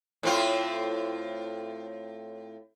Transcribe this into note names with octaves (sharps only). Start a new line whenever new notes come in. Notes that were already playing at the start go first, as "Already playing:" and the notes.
A2 C4 F4